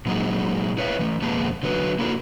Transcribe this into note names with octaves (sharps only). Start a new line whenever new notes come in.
A#2 F#3 G#3 A#3 D#4 G#4
E4 B4 C#5 E5 F5
E3 A3
F2 B2 G#3 A#3 B3 A5
D3 F#3 B4
A#3 D#4 E4 F#4 A4 A#4